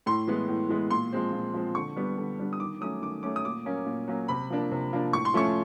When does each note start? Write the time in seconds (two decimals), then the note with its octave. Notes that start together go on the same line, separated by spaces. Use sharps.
0.06 A2 C6
0.27 E3 G#3 B3
0.48 A2
0.69 E3 G#3 B3
0.90 A#2 C6
1.13 F3 G#3 C4
1.33 A#2
1.54 F3 G#3 C4
1.75 D3 C#6
1.96 G3 B3 D4
2.18 D3
2.39 G3 B3 D4
2.53 D#6
2.60 D#3 D6
2.80 F#3 A3 C#4 D#6
3.02 D#3 D6
3.23 F#3 A3 C#4 D6
3.36 D#6
3.44 A#2 D6
3.65 F#3 A#3 C#4
3.86 A#2
4.08 F#3 A#3 C#4
4.28 C3 B5
4.50 F3 A#3 D4
4.72 C3
4.93 F3 A#3 D4
5.13 A2 C#6
5.25 C6
5.34 F3 A3 C#4 C#6